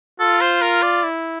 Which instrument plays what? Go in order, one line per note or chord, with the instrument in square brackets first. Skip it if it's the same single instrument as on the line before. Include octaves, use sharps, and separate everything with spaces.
[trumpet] F4 [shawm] A4
[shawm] C5
A#4
D5
[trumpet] E4